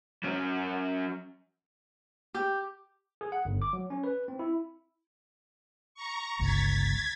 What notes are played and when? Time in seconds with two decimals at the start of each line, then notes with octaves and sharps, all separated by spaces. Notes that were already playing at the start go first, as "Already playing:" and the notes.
0.23 F#3 C#4
2.34 G4
3.21 G#4
3.32 F#5
3.45 G1
3.62 D6
3.73 F#3
3.90 C#4
4.04 B4
4.28 C4
4.39 E4
5.95 A#5 C#6
6.39 G1 C#2 G#6 A6 B6